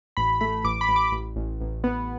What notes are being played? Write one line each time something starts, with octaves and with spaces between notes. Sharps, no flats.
A1 B5
A3 B5
A1 D6
B5
A1
D6
A1
A1
A1
B3